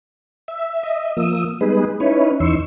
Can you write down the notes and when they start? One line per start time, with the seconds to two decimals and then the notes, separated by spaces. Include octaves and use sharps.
0.48 E5
0.83 D#5 E5
1.17 F3 A#3 D#6 E6
1.61 G3 G#3 B3 D#4 G#4 B4
2.00 C#4 D#4 E4 B4 C#5
2.40 E2 E3 D#4 C6 C#6 E6